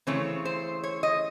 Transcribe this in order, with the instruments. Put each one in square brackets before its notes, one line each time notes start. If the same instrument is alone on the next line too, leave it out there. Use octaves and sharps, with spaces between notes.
[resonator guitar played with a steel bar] C#3 E3 A3 C4 C#5
C5
C#5
D#5